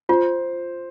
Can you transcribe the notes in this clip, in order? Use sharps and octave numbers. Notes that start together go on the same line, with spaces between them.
F4 C5